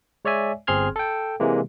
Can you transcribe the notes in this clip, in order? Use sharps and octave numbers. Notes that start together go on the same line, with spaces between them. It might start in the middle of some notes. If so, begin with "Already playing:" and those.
G#3 C#5 D5 E5 G#5
G1 C4 G#4 C6 F6 G#6
A4 G5
C3 E3 G#3 A#3